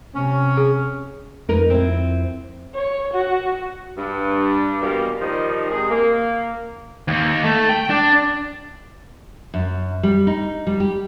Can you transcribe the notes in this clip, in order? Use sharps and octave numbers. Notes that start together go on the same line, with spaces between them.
C3 C#4
G#4
F2 D#4 A#4 B4
C4 E4
C#5
F#4
G2
E2 B2 G3 A#3
D#3 F3 G3 D#4
C3 G#3 G#4
A#3
D#2
A3
G5
D4
F#2
G3
D#4
G3
G4